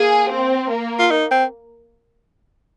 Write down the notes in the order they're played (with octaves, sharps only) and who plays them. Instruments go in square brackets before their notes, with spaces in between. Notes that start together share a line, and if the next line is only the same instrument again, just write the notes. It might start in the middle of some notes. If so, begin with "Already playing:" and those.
Already playing: [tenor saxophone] A#3 [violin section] G#4
[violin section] C4
A#3
[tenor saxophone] F4
D#4
C4